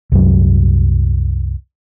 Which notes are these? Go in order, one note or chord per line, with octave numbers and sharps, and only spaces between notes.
C2 F#2 F#3